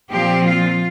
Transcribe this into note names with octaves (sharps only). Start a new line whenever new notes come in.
A#2 F3 C4 G4
F4